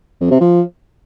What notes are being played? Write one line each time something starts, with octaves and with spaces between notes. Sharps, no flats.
F2
C3
F3